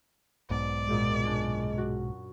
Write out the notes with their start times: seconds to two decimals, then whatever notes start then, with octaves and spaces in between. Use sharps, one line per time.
0.50 B1 G#2 B2 D5
0.88 F#2 A#2 G#3 D#6
1.24 C#4 D4
1.78 F#4